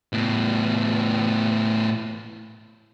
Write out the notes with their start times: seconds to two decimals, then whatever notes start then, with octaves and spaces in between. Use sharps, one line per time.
0.13 A2 B3